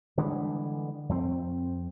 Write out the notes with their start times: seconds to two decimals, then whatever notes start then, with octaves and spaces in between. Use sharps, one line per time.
0.17 D3 E3 G3 G#3
1.09 F2 C4